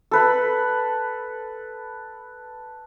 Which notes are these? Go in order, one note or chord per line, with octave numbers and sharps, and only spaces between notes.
A4 B4 B5